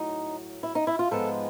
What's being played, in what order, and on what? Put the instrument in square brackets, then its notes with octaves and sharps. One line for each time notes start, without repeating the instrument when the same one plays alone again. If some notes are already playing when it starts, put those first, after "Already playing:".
Already playing: [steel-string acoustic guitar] A2 F#3 D#4
E4
D#4
E4
F4
G#2 F3 G#3 B3 A4